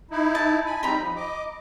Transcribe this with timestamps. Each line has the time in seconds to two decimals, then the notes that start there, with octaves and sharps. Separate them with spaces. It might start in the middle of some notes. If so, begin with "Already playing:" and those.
0.11 D#4 E4
0.35 A5
0.66 G#5 B5
0.83 G3 C4 D#4 A#5 B5
0.98 F3
1.16 D#5 D6